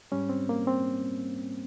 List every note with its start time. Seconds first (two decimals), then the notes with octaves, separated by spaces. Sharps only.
0.12 G#2 G3 C#4
0.29 C4
0.49 A#3
0.67 C4